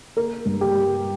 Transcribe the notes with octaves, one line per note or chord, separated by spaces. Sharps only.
A#3 A#4
G2
G4
G3